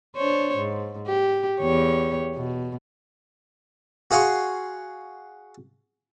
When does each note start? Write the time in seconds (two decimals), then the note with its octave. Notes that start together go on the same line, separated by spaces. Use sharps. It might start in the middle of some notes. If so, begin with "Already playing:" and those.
0.16 D4 C5 C#5
0.57 G#2
1.07 G4
1.60 E2 G4 C#5
2.35 B2
4.11 F#4 G#4 F5 C6 C#6